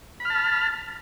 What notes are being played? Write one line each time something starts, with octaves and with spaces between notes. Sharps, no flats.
A5 B5 F6